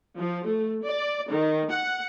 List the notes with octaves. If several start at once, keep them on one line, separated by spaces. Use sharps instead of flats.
F3
A3
D5
D#3
F#5